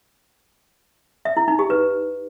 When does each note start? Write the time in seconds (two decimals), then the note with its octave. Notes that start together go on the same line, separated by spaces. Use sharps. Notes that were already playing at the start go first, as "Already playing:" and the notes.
1.25 E5
1.37 E4
1.48 D#4
1.59 G4
1.70 B4